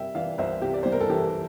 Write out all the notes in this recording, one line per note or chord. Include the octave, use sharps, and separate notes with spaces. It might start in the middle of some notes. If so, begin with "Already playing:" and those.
Already playing: C3 G3 E5 G5
E3 D5 F5
C2 C5 E5
C3 G4
D5
G3 C5
A#4
A4
E3 G4